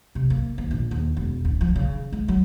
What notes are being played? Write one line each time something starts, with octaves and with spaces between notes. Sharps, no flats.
C3
A#3
D#2
A#1
D#2
E1
D1
F3
C#3
G#3
F#3